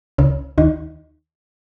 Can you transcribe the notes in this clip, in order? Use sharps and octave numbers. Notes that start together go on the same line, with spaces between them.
C#2 C#3
D#2 D#3